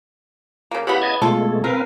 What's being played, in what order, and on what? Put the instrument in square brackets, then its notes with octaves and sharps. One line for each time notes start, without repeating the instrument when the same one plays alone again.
[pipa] C#3 A#3
[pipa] C#3 E3 B3 [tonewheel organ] G4 F#5 B5
[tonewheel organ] D#5 A5 G#6
[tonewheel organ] B2 G#3 A3 [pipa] F4 A4
[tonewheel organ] C4 B4 F5 [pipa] A#4